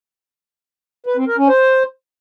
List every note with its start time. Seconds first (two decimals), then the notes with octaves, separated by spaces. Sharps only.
1.06 B4
1.17 C4
1.27 A#4
1.38 C#4
1.48 C5